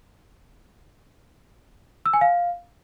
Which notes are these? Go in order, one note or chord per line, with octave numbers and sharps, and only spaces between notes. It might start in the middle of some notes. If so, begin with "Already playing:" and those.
E6
G#5
F5